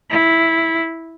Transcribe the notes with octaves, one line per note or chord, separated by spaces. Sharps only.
E4